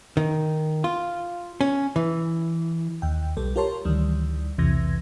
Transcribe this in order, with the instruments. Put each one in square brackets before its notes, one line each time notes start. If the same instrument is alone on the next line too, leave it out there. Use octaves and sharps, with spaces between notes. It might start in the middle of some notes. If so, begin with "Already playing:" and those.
[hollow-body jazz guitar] D#3
F4
C#4
E3
[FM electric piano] D#2 G5
B1 G3 A4
F4 G4 A#4 C#5 A5 C6
D2 D#3 E3 G3
B1 E2 C3 E3 G#6 A#6